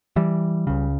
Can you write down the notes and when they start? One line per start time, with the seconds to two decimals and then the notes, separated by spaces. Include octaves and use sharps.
0.16 E3 G3
0.67 C#2 C#3